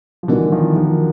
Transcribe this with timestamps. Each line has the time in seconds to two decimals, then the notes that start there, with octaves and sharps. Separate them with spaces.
0.23 F3
0.28 D3 E3 G3 B3 D#4 F#4 A#4
0.52 D#3 F3
0.76 D#3 F3